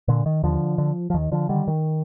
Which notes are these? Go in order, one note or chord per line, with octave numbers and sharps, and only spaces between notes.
A#2 D3
D#3
D#2 D3 F3
D3
F3
D#2 D#3
D3 F3
D3 D#3 G3
D#3